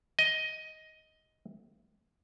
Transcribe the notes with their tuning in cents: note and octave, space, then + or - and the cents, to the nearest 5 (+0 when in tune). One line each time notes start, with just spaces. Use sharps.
D#5 +10